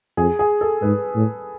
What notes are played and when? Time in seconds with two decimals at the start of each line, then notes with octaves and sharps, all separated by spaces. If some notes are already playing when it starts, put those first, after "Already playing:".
0.17 F2 G#4
0.39 G#4
0.61 A4
0.82 G#2 B4
1.15 A2